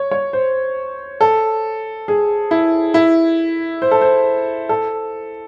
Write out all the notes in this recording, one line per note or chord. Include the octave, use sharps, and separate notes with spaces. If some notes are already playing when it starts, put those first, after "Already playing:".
Already playing: C#5
C#5
C5
A4
G#4
E4
E4
C5
A4
C5
A4